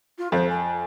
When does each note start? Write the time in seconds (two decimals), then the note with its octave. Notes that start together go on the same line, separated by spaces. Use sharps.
0.18 F4
0.32 F2 C5
0.49 G#5